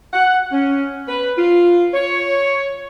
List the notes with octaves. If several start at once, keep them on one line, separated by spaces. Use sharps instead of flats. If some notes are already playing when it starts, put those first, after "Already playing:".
F#5
C#4
B4
F4
C#5